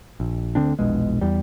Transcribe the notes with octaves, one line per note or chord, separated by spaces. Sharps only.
A#1
D2 D3 C4 D4
E1 A#1 B2 G#3
E2 G3